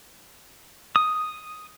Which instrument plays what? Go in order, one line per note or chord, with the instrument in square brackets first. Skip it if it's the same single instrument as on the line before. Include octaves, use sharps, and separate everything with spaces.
[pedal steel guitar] D#6